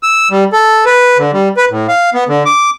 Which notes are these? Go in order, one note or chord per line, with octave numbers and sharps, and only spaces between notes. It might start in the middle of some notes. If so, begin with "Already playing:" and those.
E6
G3
A4
B4
D3
G3
B4
A2
F5
B3
D3
D6